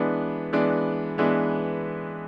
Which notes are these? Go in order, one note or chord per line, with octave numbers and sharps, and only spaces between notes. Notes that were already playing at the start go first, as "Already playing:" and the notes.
Already playing: E3 G#3 B3 D4
E3 G#3 B3 D4
E3 G#3 B3 D4